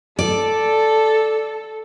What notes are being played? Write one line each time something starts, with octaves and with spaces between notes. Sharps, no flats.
A4 D5